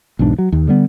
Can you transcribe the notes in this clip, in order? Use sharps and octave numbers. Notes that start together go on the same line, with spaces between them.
B1 E2 G#2 D4
F#3
D#2
D3 G3 B3